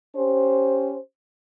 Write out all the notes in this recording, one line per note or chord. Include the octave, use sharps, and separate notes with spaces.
C#4 G4 C5